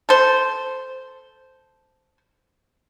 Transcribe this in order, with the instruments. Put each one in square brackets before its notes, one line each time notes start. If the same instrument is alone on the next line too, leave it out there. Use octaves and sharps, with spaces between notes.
[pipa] A4 C5